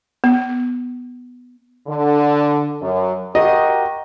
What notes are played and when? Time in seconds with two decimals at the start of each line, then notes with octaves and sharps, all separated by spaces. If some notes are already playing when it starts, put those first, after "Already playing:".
0.24 B3
1.88 D3
2.80 F#2
3.35 F#4 G4 A#4 D#5